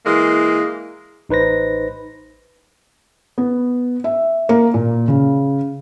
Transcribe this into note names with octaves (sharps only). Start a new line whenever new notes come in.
E3 G#3 A#3
A1 D#4 B4 C5 A#6
B3
E5
A#3
A#2
C#3